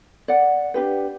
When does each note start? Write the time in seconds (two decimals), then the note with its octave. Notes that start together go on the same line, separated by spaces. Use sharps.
0.28 D5 F#5
0.74 D4 G4 B4